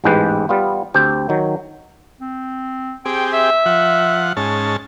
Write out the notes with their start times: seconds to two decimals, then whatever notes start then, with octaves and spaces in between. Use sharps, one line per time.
0.04 A1 E2 G#2 G#3 G4 B4
0.49 G3 B3 F4
0.94 D2 C4 G4 G5
1.29 D#3 F#3
2.21 C4
3.05 C4 G4 G#4 G5
3.33 E5
3.66 F3 F#5
4.37 G#2 C#4 A5